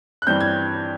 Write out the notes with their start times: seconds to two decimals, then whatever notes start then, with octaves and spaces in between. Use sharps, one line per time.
0.22 F#6
0.27 G2 E3 G3 C4 G6
0.40 G#6